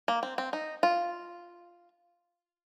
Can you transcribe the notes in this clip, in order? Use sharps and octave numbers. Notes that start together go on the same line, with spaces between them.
A#3
C4
C4
D#4
F4